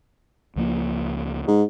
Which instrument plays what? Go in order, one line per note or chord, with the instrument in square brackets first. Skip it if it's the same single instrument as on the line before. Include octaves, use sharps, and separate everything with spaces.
[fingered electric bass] C#2 F3 A#3
[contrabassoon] G#2